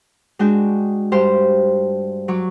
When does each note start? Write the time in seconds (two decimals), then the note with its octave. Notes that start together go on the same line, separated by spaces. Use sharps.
0.39 G#3 D4 F#4 G5 G6
1.12 G2 G4 C5 F5 G5
2.28 F#3 C#6 D6